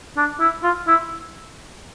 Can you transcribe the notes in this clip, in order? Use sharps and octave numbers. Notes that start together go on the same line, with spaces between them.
D4
E4
F4
E4